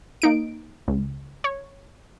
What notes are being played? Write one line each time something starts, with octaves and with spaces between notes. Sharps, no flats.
A#3 D#4 D7
C#2
C#5